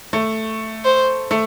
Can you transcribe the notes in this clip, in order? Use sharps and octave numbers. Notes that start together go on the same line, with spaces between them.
A3
C5
A3